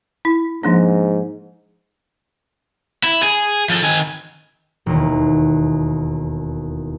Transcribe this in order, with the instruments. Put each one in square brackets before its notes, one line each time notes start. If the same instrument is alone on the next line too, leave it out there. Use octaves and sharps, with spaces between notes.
[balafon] E4
[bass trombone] G#2 [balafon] F3 A#3 D4
[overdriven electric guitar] E4
G#4
F3 A4
D#3 G#5
[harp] E1 D#2